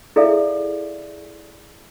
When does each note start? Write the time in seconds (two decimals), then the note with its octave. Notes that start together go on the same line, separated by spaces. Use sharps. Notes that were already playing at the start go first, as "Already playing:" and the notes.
0.16 E4 G#4 A4 D5 E5 F5